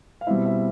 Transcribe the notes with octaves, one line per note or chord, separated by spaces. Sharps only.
F5
B2 G3 C4 E4 E5
E5